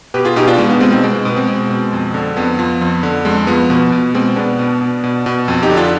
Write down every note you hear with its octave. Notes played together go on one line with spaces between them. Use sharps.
B2 G4 B4
F4 G#4
B2 D#4 G4
D4 F4
B2 G#3
B3
B2 G#3 C4
C4 D#4
B2 G#3
G#3
B2 B3
G#3 C4
B2
B2
F2
D3
F2 B3
F3
F2
D3
F2 G#3
F3 B3
B2 B3
B2
B2 G#3 C4
B2 B3 D4
B2
B2
B2
B2
F2
D#4 G4
D3
D4 F4